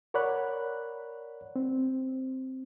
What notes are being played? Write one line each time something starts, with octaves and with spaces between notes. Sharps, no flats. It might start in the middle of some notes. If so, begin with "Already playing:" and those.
A#4 C#5 D5 F#5 B5 F#6
C4